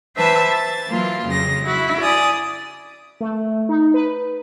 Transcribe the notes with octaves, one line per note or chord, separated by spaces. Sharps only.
E3 B4 C5 E5 A5 E6
A6
E3 F#3 A#3 F4
F2 C#3 F#3 A#6
E4 F#4
D5 G#5 D#6
A3
D#4
B4